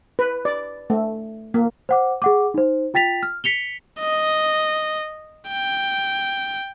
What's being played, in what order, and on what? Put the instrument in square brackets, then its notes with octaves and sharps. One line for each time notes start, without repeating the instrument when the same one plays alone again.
[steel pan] B4
D5
A3
A#3
[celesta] C5 F#5 D6
G#4 F#5 D6
D#4 C5
F4 G5 A6 B6 F7
F6
B6 C#7 F7 G7
[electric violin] D#5
G5